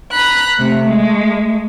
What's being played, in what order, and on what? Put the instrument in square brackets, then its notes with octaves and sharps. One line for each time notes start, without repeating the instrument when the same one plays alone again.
[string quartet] A#5 B5 F#6
[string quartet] C3 [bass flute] A3
[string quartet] G#3